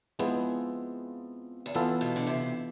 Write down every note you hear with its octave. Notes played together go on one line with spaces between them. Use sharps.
F2 F3 G#3 B3 E4 G#4
E2
F2 E3 B3 F4 A4
B2
D3
C3